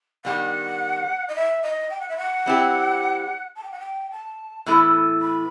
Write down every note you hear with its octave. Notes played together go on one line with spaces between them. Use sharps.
D#3 G3 B3 F#5
D#5
E5
D#5
G5
F#5
E5
F#5
G3 C4 E4 G4
A5
G5
F#5
G5
A5
A2 E3 B3 E4 A4 B5
B5